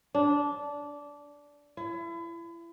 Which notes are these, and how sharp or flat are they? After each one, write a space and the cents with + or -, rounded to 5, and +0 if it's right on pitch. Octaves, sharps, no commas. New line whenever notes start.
D4 -15
E4 +35